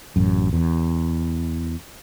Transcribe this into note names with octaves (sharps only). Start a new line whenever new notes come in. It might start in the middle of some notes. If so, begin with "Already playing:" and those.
A1 F#2
E2